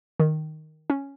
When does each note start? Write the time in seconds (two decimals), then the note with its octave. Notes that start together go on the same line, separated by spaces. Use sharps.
0.20 D#3
0.90 C#4